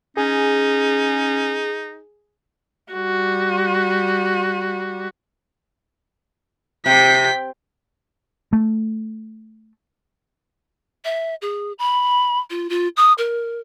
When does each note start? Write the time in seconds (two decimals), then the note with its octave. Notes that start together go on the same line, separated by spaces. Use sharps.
0.17 C#4 D#4 G#4
2.93 G3 F#4
6.86 C3 G5 B6
8.53 A3
11.05 E5
11.42 G#4
11.79 B5
12.50 F4
12.70 F4
12.97 D#6
13.18 A#4